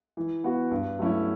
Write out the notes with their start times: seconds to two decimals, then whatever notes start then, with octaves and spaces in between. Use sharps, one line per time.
0.17 E3
0.44 B3 F#4
0.71 G2
0.99 F#3 A3 C#4 E4